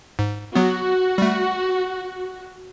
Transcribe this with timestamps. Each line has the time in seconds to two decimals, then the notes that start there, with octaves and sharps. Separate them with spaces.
0.19 G#2
0.55 F#3 B3 F#4
1.18 G3 A3